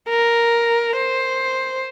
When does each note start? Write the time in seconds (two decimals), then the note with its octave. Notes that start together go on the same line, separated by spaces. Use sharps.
0.09 A#4
0.96 C5